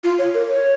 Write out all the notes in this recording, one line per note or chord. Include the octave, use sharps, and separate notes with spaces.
F4
C#5
A#4
C#5